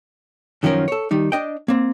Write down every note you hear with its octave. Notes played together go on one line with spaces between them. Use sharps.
F#2 D#3 F3 F#3 C#4 A#4
A4 C#5
D#3 G3 D#4
D4 D#5 G5
A#3 C4